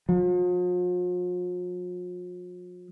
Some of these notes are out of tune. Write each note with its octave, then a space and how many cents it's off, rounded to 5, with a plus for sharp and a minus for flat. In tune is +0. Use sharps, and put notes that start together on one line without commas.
F3 +45